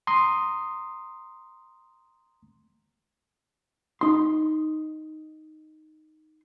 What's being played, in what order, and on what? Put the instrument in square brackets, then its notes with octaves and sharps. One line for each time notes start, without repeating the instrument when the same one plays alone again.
[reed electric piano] A#5 C6 D#6
[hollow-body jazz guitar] D#4 C6